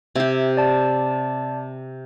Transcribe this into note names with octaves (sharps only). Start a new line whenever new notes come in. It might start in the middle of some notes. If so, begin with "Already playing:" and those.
C3 G4 E5 G#6
D5 A5